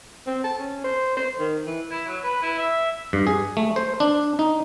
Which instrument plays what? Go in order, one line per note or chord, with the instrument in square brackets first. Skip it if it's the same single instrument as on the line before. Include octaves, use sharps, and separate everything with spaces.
[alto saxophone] C4
A5
C#4
C5
C5
D#3
E3
[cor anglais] E4
F#3
B4
E4
E5
[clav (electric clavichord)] G2
G#4
A3
C5
D4
D#4